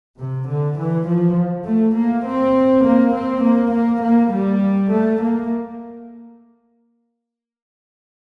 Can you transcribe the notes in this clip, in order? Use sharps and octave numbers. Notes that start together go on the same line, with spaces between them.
C3
D3
E3
F3
A3
A#3
C4
A#3
C4
A#3
A#3
A#3
G3
A3
A#3